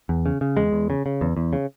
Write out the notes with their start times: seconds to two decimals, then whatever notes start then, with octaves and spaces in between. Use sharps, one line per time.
0.09 E2
0.26 C#3
0.41 C#3
0.57 E2 G#3
0.72 E2
0.90 C#3
1.06 C#3
1.21 E2
1.37 E2
1.53 C#3